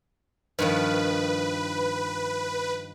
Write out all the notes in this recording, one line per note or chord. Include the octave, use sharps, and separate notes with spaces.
G2 D#3 F3 B4